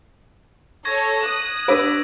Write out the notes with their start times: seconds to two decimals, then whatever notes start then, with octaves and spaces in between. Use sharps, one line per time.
0.85 A4 C#5 C#6 G#6 A#6
1.21 D#6 F#6 E7
1.68 D4 B4 D6 E6 A#6 D7